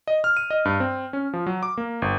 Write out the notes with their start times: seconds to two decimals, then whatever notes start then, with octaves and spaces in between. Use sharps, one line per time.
0.08 D#5
0.24 F6
0.37 D#7
0.50 D#5
0.65 G2
0.80 C4
1.13 C#4
1.33 F3
1.46 F#3
1.63 D6
1.78 A#3
2.02 G1